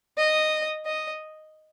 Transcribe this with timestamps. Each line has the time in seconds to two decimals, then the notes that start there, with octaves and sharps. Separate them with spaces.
0.18 D#5
0.86 D#5